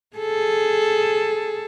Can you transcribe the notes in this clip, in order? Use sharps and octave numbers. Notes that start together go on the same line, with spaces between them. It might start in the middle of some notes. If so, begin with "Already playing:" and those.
G#4 A4